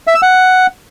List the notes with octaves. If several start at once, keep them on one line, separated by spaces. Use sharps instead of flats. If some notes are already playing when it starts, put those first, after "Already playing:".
E5
E6
F#5